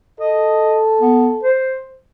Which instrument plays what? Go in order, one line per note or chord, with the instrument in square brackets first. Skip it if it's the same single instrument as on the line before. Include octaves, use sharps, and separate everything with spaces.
[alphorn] A4 [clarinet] D#5
[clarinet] B3
C5